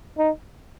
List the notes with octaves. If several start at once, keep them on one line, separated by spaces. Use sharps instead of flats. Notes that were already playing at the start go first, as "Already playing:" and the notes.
D#4